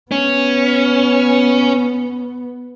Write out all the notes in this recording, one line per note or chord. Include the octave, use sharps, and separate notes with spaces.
B3 C#4